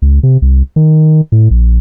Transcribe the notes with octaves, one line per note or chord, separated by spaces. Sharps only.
C#2
C3
C2
D#3
A2
A#1